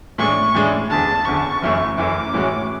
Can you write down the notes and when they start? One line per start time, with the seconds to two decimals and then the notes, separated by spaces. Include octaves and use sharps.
0.18 A2 E3 G#3 D4 C#6
0.54 A2 E3 G#3 D4
0.90 F#1 E2 D3 A5
1.25 F#1 E2 D3 C#6
1.62 F#1 F#2 E3 A3
1.98 F#1 F#2 E3 A3 D6
2.34 A2 E3 G#3 C#4 F#4